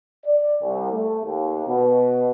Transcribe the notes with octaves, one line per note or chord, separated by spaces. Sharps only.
D5
C2
A3
D#2
B2